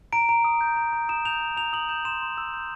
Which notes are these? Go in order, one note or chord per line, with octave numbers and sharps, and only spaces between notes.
A#5 D7
A#5
D#6
G6
A#5
A#5
D#6 E7
G6 F7
A#5
A#5 F7
D#6 F#7
G6 E7
C6 E7
C6
E6
G6